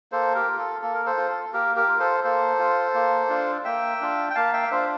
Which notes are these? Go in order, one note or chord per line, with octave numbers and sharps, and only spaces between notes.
A#3 A4 C5
G4 A#4
F4
A4
A#3 A4
A#4
A4 C5
F4
A4
A#3 G4 A#4
G4 A#4
F4
A4 C5
A#3 A4 C5
F4
A#3
D4 F4
A#3 E5 G5
D4 F4
G5
A#3 F5 A5
E5 G5
F5
D4 F4 C5 E5